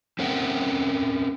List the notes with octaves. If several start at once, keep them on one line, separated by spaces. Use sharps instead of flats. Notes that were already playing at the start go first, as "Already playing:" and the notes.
C4 C#4 A#4 E5 F#5 G5